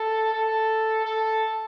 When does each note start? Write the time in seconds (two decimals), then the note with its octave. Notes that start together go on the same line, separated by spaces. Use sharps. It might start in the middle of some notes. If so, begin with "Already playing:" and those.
Already playing: A4
0.33 A4
1.05 A4